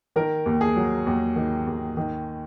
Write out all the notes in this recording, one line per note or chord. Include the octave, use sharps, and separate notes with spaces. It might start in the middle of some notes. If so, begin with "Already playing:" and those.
D#3 A#4
D#2
G#4
F#3
D#2
D#3
D#2
D#3